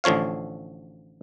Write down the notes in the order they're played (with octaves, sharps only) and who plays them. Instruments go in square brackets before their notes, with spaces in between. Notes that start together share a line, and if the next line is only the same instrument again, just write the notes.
[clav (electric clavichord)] A1 D3 F3 C#5 F5